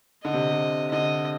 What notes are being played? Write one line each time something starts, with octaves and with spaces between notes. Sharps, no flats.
D3 D#5
C3
C3
D3 D#5